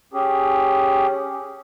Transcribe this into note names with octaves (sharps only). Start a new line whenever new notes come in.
C#4 G4 G#4